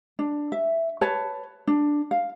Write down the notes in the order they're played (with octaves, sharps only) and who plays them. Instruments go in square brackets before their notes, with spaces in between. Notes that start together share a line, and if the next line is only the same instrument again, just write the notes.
[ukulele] D4
E5
B4 C#5 A5
D4
F5